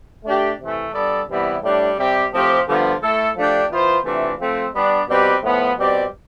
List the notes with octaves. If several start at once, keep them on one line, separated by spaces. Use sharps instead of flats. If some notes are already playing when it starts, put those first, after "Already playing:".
A3 D4 G4
C3 E3 A3
G3 B3 D4 A4 D5
C3 E3 G3 B3 E4
A2 G3 D4
C3 G3 C4 G4
A2 F3 C4 G4
G2 D3 F3 B3 F4
A3 E4 A4
F3 A3 D4 G4
E3 B3 F4 C5
C3 E3 A3 D4 F4
F3 A3 C4
G3 B3 D4
B2 G3 C4 G4 B4
A2 F3 B3
B2 G3 C4 G4 D5